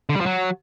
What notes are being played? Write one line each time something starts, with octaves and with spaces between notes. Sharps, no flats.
D3
G3
F3
F#3